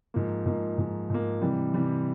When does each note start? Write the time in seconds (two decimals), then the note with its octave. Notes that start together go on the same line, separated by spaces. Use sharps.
0.14 G#2 F3 A#3
0.46 G#2 F3 A#3
0.78 G#2 F3 A#3
1.10 G#2 F3 A#3
1.42 C3 E3 G3
1.74 C3 E3 G3